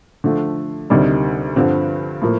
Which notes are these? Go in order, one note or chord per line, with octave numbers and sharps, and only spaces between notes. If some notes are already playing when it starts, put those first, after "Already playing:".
D3 F3 A3
D2 C3 D#3 G3 D4
G2 D3 F3 C4
A2 F3 A#3